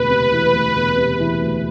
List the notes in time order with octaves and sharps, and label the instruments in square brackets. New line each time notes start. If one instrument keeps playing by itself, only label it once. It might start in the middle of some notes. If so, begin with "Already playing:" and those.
Already playing: [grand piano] E1 D2 [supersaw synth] B4
[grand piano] C3
E3
D2
E1
C3
E3
D2